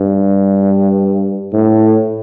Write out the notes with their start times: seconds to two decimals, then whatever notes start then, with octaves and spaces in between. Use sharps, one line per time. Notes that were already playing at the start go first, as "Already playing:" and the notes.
Already playing: G2
1.53 A2